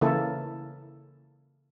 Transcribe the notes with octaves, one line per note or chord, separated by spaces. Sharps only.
C#3 E3 A#3 E4 A4